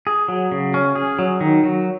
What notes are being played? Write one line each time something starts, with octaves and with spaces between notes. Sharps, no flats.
G#4
F#3
C#3
C#4
G#4
F#3
D#3
F#3